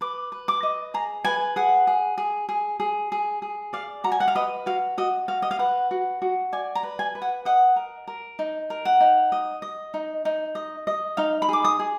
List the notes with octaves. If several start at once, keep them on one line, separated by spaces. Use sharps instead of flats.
B4 D6
B4
D6
D#5
G#4 A#5
B4 G#5
G#4 F#5
G#4
G#4
G#4
G#4
G#4
G#4
D5 F5
F#4 A#5
G#5
F#5
F5
B4 D#5
F#4 F5
F#4 D#5
F#4 F5
D#5
F5
B4 F#5
F#4
F#4
D5 G#5
A#5
B4
G#5
B4
F#5
D#5 F#5
A#4
A#4
D#4
A#4
F#5
D#4
D#5
D#5
D#4
D#4
D#5
D#5
D#4 F5
B5
G#4 D6
D#6
G#4